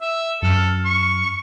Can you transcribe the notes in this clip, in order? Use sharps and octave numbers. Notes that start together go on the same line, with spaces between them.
E5
F#2 A4 F6
C#6